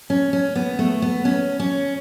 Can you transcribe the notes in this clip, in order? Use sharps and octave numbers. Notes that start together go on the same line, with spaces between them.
C#4
C#4
B3
A3
B3
C#4
C#4